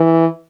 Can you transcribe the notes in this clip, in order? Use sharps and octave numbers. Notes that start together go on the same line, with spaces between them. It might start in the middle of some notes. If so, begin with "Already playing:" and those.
Already playing: E3